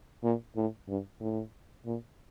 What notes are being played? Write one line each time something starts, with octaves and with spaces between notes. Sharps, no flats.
A#2
A2
G2
A2
A#2